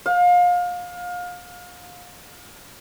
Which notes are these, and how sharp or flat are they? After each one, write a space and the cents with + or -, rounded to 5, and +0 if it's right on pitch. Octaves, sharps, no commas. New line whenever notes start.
F5 +30